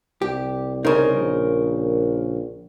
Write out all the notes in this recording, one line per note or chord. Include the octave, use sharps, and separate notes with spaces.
C2 G4
C#3 D#4 A#4 C5
A#1